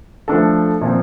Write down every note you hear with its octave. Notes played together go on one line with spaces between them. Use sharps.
F3 A3 D4 A4
A#2 F3 C4